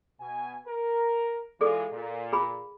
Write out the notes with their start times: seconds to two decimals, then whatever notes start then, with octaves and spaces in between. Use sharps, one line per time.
0.20 B2 G#5
0.68 A#4
1.61 E3 G#3 F4 G#4 A4 D5
1.92 A#2
2.33 G#4 B5